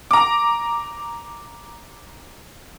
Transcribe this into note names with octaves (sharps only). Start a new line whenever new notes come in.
A#5 D6